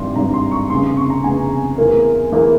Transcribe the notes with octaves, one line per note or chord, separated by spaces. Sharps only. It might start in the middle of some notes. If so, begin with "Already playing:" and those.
Already playing: G#1 G2 E3 G3 C6
G#1 G2 E3 G3 A#5
C6
C#6
F1 E2 C#3 C6
C#6
A#5
F1 E2 C#3 G#5
E2 E3 A#3
E2 E3 A#3